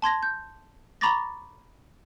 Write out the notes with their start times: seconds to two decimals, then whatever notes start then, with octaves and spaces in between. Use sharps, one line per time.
0.02 A5 C6 G#6 A#6
0.23 G6
1.01 A#5 B5 C#6 D6 A6 A#6